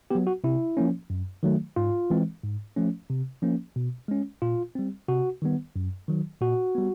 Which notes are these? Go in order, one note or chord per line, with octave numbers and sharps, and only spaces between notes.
F#3 B3 G4
F#4
C3 E4
F3 A#3 C#4
F#2
D#3 F#3 A3
G#2 F4
E3 G#3 C4
G#2
F3 A3 C#4
C3
F3 A#3 C#4
B2
G#3 C#4
A#2 F4
G3 C4
C3 F#4
D#3 G3 B3
F#2
D#3 F#3
A#2 F#4
G3 B3